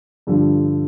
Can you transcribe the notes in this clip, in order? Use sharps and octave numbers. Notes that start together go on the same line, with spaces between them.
G2 D3 F3 G3